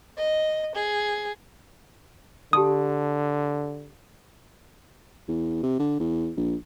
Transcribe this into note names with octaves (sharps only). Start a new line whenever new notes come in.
D#5
G#4
D3 G4 A5 C6 D#6
E2
C3
D3
E2
A#1